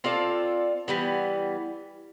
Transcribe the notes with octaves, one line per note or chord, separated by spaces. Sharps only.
C4 F4 A4 D5
E3 G3 B3